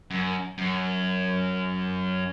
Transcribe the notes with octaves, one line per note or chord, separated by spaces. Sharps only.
F#2
F#2